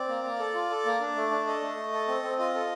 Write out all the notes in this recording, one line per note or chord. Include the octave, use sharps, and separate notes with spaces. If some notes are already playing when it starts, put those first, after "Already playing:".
Already playing: C4 D5
A#3
A#3
A4
F4
A4
A#3
D4
A3
D4
A4 D#5
A3
A3
A4
C4
C4
F4 D#5
A4